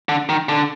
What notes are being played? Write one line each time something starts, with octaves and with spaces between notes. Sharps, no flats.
D3
D#3
D3